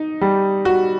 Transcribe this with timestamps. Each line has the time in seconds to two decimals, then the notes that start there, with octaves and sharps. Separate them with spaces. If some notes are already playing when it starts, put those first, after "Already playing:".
Already playing: D#4
0.21 G3
0.65 F#4